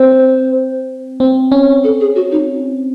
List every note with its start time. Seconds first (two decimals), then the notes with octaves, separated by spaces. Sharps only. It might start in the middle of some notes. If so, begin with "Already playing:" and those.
Already playing: C4 C5
1.20 C4
1.52 C#4
1.84 A4
2.00 G#4
2.15 F#4
2.31 D#4